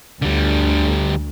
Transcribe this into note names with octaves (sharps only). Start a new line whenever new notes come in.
D2 D3 G3